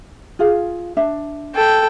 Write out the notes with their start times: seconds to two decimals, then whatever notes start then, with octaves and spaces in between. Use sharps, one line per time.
0.39 F4 G#4 F5
0.97 D4 E5
1.55 A4 G5